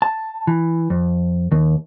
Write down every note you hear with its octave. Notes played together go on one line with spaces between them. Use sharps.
A5
E3
F2
D#2